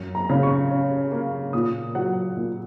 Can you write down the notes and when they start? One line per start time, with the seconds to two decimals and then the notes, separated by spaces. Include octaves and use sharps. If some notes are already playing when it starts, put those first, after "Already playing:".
Already playing: F#2
0.15 A#5
0.29 C#3
0.43 C#6
0.70 C#4
1.12 A#3
1.53 A#2 D#6
1.95 F#3 F#5
2.37 A#2